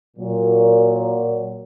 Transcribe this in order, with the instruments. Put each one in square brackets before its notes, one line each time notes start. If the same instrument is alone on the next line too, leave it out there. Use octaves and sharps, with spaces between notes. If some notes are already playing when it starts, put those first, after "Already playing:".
[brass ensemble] A#2 F#3